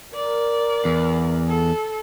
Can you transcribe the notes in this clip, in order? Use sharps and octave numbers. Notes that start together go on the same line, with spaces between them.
A#4 D5
E2
A4